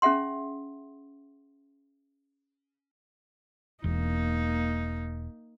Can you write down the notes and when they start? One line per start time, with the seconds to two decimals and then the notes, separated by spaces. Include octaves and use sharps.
0.02 C#4 G#4 E5 F#5 C6
3.84 E1 A#3 D#4